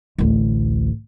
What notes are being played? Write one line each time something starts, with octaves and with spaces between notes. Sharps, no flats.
A1 D2